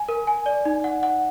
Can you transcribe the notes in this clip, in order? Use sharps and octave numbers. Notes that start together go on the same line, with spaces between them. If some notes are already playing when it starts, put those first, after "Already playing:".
Already playing: G#5
A#4
G#5
D5
D#4
F#5
F#5